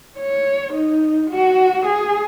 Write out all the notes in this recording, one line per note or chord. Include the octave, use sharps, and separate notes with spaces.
C#5
D#4
F#4
G#4